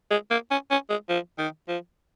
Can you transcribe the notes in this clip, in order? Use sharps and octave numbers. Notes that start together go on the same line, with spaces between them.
G#3
A#3
C#4
C#4
G#3
F3
D#3
F3